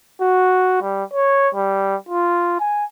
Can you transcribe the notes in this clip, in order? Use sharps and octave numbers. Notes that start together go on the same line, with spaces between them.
F#4
G3
C#5
G3
F4
G#5